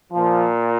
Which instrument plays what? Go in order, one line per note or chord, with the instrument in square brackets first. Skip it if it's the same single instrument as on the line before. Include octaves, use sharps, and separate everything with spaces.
[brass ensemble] A#2 F3